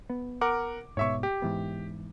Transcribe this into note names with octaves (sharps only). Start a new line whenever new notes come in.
B3
A#4 F#5 D6
G#2 B2 C#5 E5 C#6
G4
G#2 E3 B3